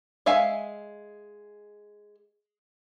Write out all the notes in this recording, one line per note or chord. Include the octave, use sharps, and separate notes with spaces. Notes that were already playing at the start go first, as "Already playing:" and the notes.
G#3 E5 F5 G#5